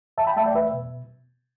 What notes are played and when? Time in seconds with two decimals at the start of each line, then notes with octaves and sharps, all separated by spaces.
0.18 E2 E5 A5
0.27 G5 B5
0.36 A3 E5 A5
0.45 D5 G5
0.54 E2 B4 E5
0.73 B2